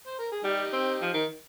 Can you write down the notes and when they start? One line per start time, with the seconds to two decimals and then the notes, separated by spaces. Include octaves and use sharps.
0.07 C5
0.19 A#4
0.32 G#4
0.44 G3 D#4 G4
0.73 C4
1.02 F3
1.14 D#3